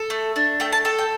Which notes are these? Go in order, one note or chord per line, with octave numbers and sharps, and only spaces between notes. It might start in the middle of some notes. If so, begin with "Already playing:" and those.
Already playing: A4
A3
D4
A3 G5
A5
A4 G5
G5